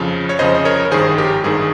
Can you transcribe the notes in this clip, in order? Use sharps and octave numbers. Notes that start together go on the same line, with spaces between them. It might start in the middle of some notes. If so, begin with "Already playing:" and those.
Already playing: F2 C#3 F3
C#5
F2 C#3 F3 C5 D#5
D#5
A#4 C#5
A#4
G#1 G2 D#3 G#4 C5
G4 A#4
G#1 G2 D#3 G#4